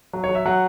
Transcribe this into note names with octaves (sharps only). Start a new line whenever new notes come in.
F#3
C#5
F#3
E5
F#3 F#5